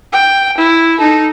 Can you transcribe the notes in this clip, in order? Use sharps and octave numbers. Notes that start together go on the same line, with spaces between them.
G5
E4
D#4 A4